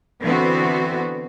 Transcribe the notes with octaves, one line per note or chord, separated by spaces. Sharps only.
D3 E3 B3 C4 F#4